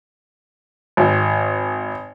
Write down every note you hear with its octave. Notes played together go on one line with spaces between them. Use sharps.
G#1